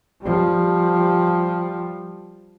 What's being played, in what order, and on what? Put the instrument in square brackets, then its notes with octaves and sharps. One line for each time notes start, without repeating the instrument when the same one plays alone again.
[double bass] F3 G3